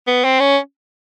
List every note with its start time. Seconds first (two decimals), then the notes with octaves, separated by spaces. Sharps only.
0.07 B3
0.24 C4
0.40 C#4